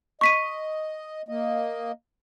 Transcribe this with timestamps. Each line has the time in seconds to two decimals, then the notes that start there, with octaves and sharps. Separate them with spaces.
0.21 D#5 C#6 B6 D#7
1.28 A#3 D#5